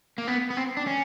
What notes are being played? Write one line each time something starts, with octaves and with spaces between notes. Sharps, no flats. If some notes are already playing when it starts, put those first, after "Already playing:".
A#3
B3
B3
C4
D4
C#4